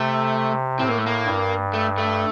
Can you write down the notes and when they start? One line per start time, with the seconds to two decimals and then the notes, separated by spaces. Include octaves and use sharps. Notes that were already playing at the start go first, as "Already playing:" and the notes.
Already playing: C3 A3
0.79 A2 C4
0.89 A#3
0.98 A3
1.06 A#3
1.26 G2
1.73 A3
1.98 A3